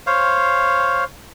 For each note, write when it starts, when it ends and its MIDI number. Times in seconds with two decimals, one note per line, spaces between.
0.07 1.04 72
0.07 1.04 73
0.07 1.04 77